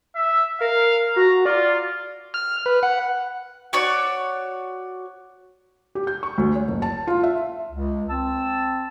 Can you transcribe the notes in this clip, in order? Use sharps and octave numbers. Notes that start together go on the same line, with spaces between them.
E5
A#4 F5
F#4 A#5
F4 D5
F6
B4
F#5
F#4 C#5 D5
G4
G6
C#6
D2
C#5
F#1
A5
F4
E5
C#2
C4 A5 E6